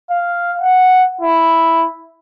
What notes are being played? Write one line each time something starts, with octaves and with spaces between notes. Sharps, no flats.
F5
F#5
E4